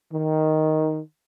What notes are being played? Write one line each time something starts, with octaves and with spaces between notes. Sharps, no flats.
D#3